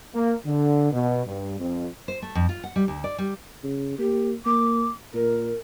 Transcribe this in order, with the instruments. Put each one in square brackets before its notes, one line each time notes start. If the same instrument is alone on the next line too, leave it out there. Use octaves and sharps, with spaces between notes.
[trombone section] A#3
D3
B2
G2
F2
[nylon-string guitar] C5
A3
F2
F4
F#5
G3
D2
D5
G3
[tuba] C#3
[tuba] A#3 [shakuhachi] G4
[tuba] A#3 [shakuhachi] D6
[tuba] A#2 [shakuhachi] A#4